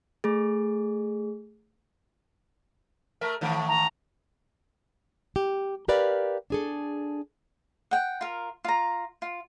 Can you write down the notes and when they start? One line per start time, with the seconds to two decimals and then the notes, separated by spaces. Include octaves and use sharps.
0.24 A3 G#4
3.21 A3 A#4 E5
3.41 A2 D#3 A3
3.68 A#5
5.36 G4
5.88 G4 A#4 B4 D5 F5
6.50 D4 G#4 A4
7.91 F#5 G5
8.21 F4 A#4
8.64 F4 A#5
9.22 F4